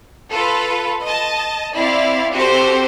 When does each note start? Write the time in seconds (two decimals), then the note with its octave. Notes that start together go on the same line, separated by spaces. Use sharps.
0.31 F4 A4 B4
1.05 D#5 A5
1.74 C4 E4 D5 F5
2.32 C4 F#4 G4 A4 C5